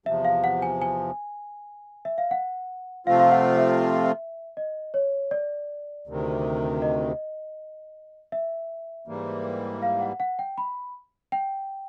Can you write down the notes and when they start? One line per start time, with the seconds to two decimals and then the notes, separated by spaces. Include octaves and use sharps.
0.06 E2 C3 F3 E5
0.25 F5
0.44 F#5
0.62 G#5
0.82 G#5
2.05 E5
2.18 F5
2.31 F#5
3.06 C3 F3 A3 C4 F4 F5
3.20 F5
3.32 F#5
3.57 E5
4.57 D#5
4.94 C#5
5.31 D5
6.07 D2 C3 D#3
6.82 D#5
8.32 E5
9.07 G#2 E3 G3 A#3
9.82 F5
10.01 F#5
10.20 F#5
10.39 G5
10.58 B5
11.32 G5